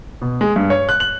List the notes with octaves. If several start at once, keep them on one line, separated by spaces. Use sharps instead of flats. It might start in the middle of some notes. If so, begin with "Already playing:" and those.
B2
G#3
G2
C#5
F#6
F#7